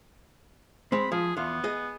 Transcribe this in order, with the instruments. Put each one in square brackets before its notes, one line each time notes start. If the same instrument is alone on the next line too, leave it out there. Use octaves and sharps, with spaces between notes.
[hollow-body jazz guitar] G#3 C4 [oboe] B5
[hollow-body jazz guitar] F3 [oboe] G#4
[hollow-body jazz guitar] E2 F4 [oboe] B3
[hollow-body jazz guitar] G#4 D#5